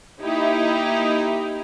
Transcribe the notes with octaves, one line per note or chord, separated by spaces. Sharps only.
A#3 D#4 E4 G4